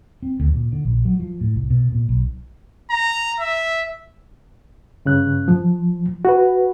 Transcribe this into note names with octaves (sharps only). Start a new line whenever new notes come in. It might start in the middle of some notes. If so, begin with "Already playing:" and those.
C4
D2
A#2
D3
A#1
F#3
F3
A2
C2
B2
A#2
B1
A#5
E5
G2 C#3 F#6
F3
F#4 B4